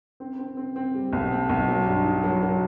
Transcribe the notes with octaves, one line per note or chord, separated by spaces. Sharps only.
C4
C4
C4
C4
G3
B1
C4
B1
F#3
G2
D#4
F#3
F#3